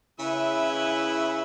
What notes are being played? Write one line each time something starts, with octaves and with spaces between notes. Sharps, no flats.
C#3 E4 B4 E5